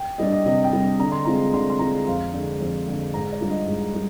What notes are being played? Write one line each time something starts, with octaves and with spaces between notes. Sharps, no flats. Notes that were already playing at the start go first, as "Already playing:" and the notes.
Already playing: G5
G3 D4 D#5
D#5
C3 D#5
G5
G3 D4
D3 A#5
C6
G#3 C4 F4 A#5
D3 C6
C6
G#3 C4 F4 A#5
F2 F5
D3 G#3
F2
D3 G#3
G#2 A#5
D5
G3 D4 F4
D#5
G#2
G3